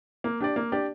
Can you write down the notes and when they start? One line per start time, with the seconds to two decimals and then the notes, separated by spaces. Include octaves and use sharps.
0.24 A#3
0.40 D4 G4 D5
0.56 A#3
0.72 D4 G4 D5